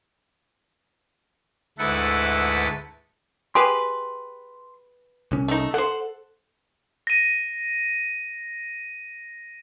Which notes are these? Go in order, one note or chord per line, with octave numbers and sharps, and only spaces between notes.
D2 G#2 E4 A4 B4 F#5
G4 G#4 B4 C6
C2 C#4
A3 D#4
A4 C5 F#5
A#6 D#7